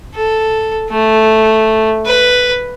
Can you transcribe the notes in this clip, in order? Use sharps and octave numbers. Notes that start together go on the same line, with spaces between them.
A4
A3
B4